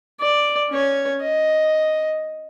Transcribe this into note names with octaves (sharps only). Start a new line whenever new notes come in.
D5
C#4 C#5
D#5